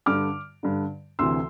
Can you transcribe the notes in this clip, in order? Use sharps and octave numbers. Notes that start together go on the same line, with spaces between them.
G2 D3 D6 F6
G2 D3
D2 C3 E3 C6 E6